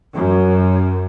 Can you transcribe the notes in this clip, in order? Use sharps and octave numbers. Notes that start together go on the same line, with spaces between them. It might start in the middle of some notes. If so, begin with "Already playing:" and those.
F#2